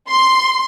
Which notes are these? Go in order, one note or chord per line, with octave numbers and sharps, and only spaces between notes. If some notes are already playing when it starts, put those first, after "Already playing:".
C6